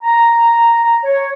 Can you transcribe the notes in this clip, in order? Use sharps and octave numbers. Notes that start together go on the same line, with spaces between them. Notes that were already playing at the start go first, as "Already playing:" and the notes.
A#5
C#5